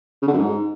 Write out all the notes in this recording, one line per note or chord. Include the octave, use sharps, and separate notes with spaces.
C#3
D3
F#2
G#2